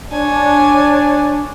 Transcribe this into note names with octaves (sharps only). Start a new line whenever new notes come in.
D4 C#5 G#5 A5